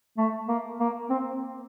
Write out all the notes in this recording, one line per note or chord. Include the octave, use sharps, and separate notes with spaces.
A3
A#3
A#3
C4